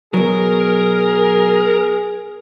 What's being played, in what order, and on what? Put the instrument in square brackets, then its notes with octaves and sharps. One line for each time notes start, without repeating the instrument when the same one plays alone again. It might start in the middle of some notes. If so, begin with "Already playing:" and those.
[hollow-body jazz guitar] B2 F#3 [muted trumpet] G#4 [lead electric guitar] A#4